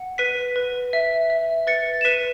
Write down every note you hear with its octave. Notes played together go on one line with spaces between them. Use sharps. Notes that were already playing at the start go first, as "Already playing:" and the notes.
Already playing: F#5
B4 B6 D#7
B4
E5
E5
B4 A6 C#7
E7
B4 B6 D#7